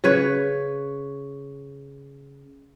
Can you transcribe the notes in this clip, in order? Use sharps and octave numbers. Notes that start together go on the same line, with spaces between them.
C#3 B4 C#5